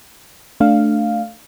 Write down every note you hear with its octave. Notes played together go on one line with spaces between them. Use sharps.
A3 D4 F5